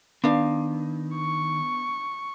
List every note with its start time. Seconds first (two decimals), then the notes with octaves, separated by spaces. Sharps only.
0.24 D#3 B3 D4 F5
1.16 C#6